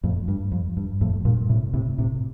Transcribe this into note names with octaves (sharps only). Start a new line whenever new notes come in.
F2 A2
G2
F2
G2
F2 A2
G2 A#2
A2 C3
A2 C3
A2 C3